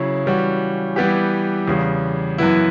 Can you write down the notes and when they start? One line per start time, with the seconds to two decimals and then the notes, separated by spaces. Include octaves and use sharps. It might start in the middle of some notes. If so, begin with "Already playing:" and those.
Already playing: C#3 F#3 C#4 E4
0.26 E3 G3 C#4 F#4
0.96 E3 G3 B3 E4 G4
1.68 E2 C#3 G3
2.38 F#2 E3 B3 E4